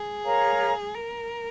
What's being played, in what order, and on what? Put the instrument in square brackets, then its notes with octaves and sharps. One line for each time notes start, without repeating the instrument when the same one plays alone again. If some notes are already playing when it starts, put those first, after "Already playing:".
Already playing: [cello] G#4
[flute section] A#4 C#5 F5 A#5
[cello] A#4